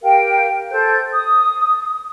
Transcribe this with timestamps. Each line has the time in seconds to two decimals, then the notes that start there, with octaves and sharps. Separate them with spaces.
0.01 G4 A#4 F5 G5
0.70 A4 C5 G6
1.13 D#6